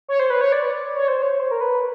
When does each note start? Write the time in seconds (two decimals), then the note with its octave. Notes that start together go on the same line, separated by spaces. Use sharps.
0.08 C#5
0.20 C5
0.30 B4
0.41 C#5
0.52 D5
0.96 C#5
1.08 C5
1.22 C#5
1.40 C5
1.51 A#4
1.61 B4